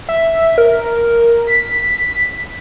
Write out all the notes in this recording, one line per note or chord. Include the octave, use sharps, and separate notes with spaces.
E5
A#4
B6